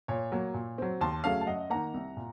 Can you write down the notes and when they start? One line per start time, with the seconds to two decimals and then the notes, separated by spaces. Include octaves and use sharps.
0.08 A#2 C#5
0.32 F#3 A#3
0.54 A#2
0.78 F#3 C4
1.01 D#2 A5 C6
1.24 C#3 F#3 A3 F5 A5
1.41 A5
1.47 F#2 D#5 F#5
1.70 D#3 A#3 F#5 A#5
1.94 C2
2.17 A#2